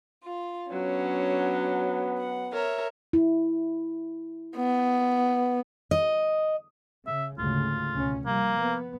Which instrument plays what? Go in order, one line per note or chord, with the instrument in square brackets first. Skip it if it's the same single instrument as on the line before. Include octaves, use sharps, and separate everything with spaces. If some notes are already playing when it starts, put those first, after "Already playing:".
[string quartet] F4
[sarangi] F#3 [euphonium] B3 [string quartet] C#4 D4
[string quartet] F#5
[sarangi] A#4 [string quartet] C#5 E5
[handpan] E4
[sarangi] B3
[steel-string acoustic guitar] D#5
[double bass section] C#3 [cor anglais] E5
[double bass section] D2 G#2 C#3 [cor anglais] F4
[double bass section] C#2 B2 C#4
[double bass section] C3 F3 G3 [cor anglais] A#3
[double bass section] B3